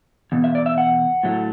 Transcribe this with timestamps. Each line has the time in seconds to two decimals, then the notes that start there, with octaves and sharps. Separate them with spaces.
0.32 E2 B2
0.44 E5
0.55 D5
0.66 E5
0.78 F#5
1.23 A2 F#3 A3